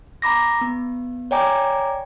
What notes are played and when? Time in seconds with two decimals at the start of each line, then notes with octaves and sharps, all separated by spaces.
0.22 A#5 B5 D6 A#6
0.61 B3
1.31 C#5 D5 G5 G#5 A#5 D6